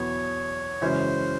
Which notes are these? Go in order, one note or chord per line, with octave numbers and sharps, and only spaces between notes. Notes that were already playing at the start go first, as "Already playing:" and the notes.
Already playing: E2 B2 F#3 B3 E4 C#5
F#2 C#3 E3 G#3 C#4 C5